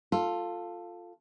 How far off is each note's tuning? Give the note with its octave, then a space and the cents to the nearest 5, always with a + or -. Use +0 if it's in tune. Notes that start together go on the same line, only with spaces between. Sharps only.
F4 +5 A4 +10